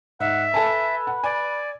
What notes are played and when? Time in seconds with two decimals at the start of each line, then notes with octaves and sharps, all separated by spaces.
0.20 G#2 E5 F#5
0.54 A4 B4 G#5 A5
1.07 F#5
1.24 D5 G#5